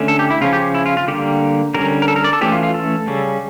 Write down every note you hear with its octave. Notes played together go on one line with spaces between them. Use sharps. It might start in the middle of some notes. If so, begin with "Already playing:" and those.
Already playing: D3 A3 C#4
A4
G4
E4
C#3 F3 C#4 F4
G4
E4
F4
F4
D3 G3 A#3 G4
D3 G3 C#4 A#4
A#4
A4
A#4
D5
A4
E3 A3 C#4 G4
F4
F4
A4
C#3 G3 C#4